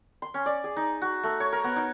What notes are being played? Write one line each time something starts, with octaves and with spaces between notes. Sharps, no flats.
C6
C#4
D5
G#4
D#4
F#4
A3
C#5
A#4
B3
D#4